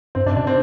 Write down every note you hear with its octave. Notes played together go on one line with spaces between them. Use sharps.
G2 C4
G2 D4
B2 D4
C4